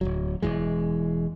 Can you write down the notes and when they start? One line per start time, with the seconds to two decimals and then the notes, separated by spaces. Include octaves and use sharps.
0.01 D1 C2 F#3
0.42 E1 D#2 E3 G#3